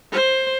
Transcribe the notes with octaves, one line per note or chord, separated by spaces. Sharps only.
C5